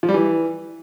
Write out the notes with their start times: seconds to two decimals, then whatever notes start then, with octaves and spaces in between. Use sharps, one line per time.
0.03 F3
0.09 G3
0.14 E3